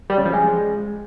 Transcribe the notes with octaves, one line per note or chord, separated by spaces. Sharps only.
G3
C#3
F3
G#3